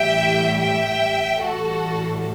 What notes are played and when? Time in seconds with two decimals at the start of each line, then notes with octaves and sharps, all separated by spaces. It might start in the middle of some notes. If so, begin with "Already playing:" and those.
Already playing: A2 E3 G3 E5 G5
0.60 E5 G5
1.41 A2 E3 G3 F#4 A4